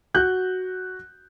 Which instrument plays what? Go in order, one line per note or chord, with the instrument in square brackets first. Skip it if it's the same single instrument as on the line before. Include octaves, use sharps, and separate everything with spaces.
[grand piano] F#4 F#6 G6